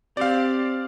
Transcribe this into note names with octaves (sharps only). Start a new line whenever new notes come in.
C4 G4 D5 F5